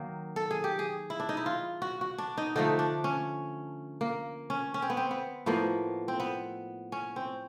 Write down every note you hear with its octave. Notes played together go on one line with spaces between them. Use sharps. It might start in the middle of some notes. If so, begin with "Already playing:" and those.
Already playing: D#3 F#3 A#3
A4
G#4
G4
G#4
E4
D4
D#4
E4
F4
F#4
F#4
D4
D#4
D3 F3 A3 D#4
D4
C#4
A#3
C#4
C#4
C4
B3
C4
B3
A2 F3 A#3 B3
C4
B3
C#4
C4